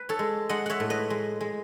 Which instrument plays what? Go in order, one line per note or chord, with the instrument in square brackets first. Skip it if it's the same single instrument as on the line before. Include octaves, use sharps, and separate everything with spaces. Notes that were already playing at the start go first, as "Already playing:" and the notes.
Already playing: [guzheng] B4
A4 C#5
G#3
G#3 D#5 F#5
C#5 E5 F#5
A2
B4 D#5
G#3
G#3